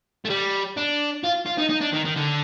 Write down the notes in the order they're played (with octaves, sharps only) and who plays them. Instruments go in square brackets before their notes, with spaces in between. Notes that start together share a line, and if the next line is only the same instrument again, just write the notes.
[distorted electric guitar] A3
G3
D4
F4
F4
D#4
D#4
D4
D#3
D#3
D3